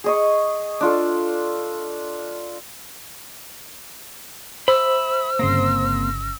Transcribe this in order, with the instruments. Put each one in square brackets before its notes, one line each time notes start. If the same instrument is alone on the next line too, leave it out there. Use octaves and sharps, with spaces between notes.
[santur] G#4 D#5 C#6
D4 F4 A4
[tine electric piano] C5 [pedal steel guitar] E5 B5 [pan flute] E6
[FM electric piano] G1 C#3 A#6 [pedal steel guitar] A#3 C4 C6